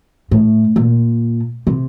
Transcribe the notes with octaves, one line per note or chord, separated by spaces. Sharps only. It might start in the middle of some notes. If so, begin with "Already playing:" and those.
A2
A#2
C3